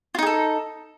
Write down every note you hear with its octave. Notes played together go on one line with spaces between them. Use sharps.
D#4 F4 G#4 A4